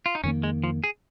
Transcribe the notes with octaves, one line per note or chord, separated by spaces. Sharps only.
F4
D#4
F2 D#3 A#3 C#4
G#3
F3
G#4